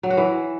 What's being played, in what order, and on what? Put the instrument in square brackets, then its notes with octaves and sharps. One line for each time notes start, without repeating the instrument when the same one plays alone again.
[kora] F#3
F#4
E3